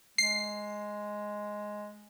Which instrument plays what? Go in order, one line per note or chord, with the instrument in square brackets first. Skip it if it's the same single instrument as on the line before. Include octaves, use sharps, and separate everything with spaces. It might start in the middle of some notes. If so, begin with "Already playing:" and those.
[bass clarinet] G#3 [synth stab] C7